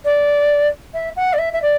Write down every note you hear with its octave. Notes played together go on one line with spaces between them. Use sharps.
D5
E5
F#5
D5
E5
E5
D5